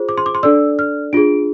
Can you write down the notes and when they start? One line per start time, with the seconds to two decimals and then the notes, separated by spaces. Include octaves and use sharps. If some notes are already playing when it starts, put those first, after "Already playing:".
Already playing: F4 G#4 C5
0.09 D6
0.18 C6
0.26 D6
0.35 C6
0.43 D4 A4 D5 E6
0.79 F6
1.13 D4 F4 G#4 D7